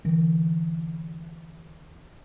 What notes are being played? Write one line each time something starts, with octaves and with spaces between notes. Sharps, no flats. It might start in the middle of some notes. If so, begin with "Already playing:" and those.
D3 E3